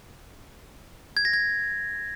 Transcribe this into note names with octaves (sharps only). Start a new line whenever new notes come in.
G#6
A#6
G#6